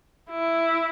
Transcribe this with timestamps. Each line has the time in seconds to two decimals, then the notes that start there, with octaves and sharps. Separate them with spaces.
0.30 E4